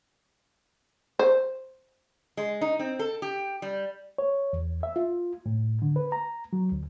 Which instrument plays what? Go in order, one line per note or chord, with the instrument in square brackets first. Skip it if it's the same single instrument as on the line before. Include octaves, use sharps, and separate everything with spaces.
[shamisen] C5
[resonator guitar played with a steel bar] G#3
D#4
C4
A4
G4
G3
[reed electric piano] C#5
E2
E5
F4
A2
D3
B4
A#5
F#3
D2